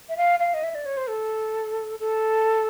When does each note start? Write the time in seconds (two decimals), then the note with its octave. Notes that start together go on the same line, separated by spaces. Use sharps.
0.09 E5
0.17 F5
0.40 F5
0.54 D#5
0.63 E5
0.75 D5
0.85 C#5
0.97 C5
1.08 A4
2.00 A4